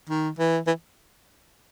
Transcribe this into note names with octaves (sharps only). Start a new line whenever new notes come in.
D#3
E3
E3